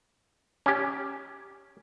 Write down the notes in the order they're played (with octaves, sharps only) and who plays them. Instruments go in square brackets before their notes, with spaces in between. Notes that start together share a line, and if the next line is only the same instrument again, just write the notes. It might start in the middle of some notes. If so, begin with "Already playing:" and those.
[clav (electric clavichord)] C#4 G4